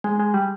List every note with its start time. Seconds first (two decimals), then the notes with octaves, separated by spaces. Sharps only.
0.04 G#3
0.20 G#3
0.34 G3